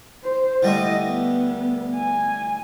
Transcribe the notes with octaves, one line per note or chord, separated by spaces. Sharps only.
C5
D3 G3 A3 E4 D#5
B3
G#5